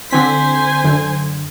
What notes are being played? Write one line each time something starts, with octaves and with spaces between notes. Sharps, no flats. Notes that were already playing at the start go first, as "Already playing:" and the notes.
D3 C4 C5 G#5 B6
F#2 D3